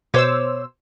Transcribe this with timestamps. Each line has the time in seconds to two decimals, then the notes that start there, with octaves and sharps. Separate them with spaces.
0.14 B2 C5 C#5 D6 E6